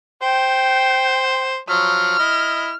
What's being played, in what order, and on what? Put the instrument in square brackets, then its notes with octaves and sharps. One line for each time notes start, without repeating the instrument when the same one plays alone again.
[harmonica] C5 [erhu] G5
[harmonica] F3 F#3 [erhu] F6
[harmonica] E4 D#5